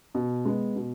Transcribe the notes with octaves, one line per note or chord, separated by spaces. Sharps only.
B2
G#3 B3
B2